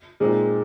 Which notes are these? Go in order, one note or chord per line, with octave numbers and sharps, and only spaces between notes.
A#2 G#3 C4 D#4